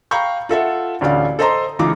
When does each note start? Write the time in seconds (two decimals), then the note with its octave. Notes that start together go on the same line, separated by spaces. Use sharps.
0.11 F5 G5 A#5 B5 C#6 G6
0.49 F4 A4 E5 F#5
1.01 A1 D2 D3 D5 F5
1.39 A4 C5 D#5 A5 A#5 C6
1.79 C#2 E3 D#4 F4 D6